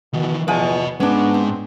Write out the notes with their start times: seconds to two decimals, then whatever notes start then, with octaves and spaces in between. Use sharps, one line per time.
0.13 B2 D#3 E3
0.48 E2 F3 B4 D#5 G#5
1.00 G#2 G#3 B3 C#4 D4
1.34 C4